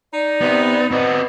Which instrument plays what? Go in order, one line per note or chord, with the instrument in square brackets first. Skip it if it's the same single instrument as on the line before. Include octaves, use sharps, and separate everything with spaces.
[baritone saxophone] D#4 [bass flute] D5
[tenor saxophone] C3 [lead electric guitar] B3
[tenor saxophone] B3 [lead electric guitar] C4 F#4 [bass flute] D#5